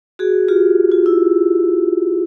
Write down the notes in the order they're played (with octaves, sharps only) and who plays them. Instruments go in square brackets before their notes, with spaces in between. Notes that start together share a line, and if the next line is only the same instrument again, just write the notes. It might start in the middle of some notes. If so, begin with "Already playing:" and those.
[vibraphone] F#4 G#4
F4 G4
F4
E4